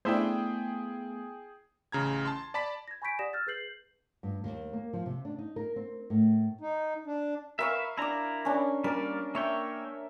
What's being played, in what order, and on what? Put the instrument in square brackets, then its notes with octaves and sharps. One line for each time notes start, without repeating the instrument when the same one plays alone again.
[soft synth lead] A3 [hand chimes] B3 [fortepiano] D4 E4 C5 [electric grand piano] G#4 G5
[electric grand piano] A1 C#3 A#5 G#6
A5 C6
D5 A5 B5 B6
[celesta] G#6 A#6
G#5 B5 C#6 G6 B6 D7
G4 D5 F#5 D#6 A#6 E7
E6 F6 G6 A6
G#4 B4 G6 C7 F#7
[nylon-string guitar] G2
D#2
A#3
F3
C3
D4
D#4
A#4
C4
A2
[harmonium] D#4
D4
[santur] A#4 F5 C#6 [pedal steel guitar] B4 E5
[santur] D4 D6 [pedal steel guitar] E4 A#5
[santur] C#4 D4
[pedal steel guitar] G3 A#3 D5 [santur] A#4 A5
[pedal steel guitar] A#3 C#5 G5 [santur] E5